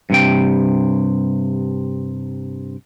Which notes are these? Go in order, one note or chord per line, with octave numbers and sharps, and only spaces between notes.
G2 C3 G5